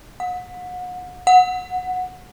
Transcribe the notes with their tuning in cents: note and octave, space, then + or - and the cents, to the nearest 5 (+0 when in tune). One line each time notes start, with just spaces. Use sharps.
F#5 -35
F#5 -15